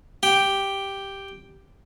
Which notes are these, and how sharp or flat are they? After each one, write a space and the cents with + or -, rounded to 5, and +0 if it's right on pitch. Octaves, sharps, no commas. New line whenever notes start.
G4 +0 G5 +0